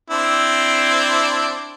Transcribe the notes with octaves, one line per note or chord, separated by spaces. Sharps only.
C4 D4 E4